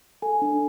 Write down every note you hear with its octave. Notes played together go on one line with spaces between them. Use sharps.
A4 G#5
D4